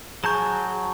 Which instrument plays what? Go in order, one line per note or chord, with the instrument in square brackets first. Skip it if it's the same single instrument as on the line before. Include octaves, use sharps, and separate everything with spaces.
[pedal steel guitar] F#3 A5 G6 [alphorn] G#4 [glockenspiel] A#5 C#6